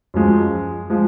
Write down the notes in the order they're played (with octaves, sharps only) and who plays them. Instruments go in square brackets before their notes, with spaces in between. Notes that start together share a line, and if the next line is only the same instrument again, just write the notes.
[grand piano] F#2 F3 G#3
F3 G#3